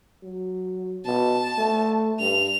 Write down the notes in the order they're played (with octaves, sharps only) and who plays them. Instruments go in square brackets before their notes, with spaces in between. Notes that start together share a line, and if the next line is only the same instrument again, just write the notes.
[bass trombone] F#3
[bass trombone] B2 [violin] A5
[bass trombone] A3
[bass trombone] G2 [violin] F7